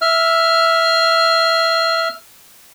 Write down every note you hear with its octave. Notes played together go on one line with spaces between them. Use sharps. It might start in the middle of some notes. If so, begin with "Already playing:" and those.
E5 F6